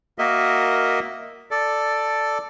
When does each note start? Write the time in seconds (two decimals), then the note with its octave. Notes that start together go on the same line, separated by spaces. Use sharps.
0.19 A#3 F#4 A#4 D#5 E5
1.51 A4 D5